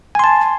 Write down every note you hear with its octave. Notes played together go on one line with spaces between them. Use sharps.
G#5 A5 C6